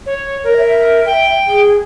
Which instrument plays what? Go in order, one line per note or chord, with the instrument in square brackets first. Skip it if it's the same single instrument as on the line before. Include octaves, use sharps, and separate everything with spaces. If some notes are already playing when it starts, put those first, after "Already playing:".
[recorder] C#5
[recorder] A#4 [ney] C#5
[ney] E5
[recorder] G5
[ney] G#4